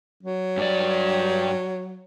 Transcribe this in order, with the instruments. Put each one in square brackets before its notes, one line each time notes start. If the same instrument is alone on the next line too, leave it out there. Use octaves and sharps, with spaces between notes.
[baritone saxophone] F#3
[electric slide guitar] G2 D5